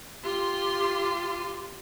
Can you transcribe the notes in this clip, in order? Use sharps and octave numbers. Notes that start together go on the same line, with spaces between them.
F4 G4 C6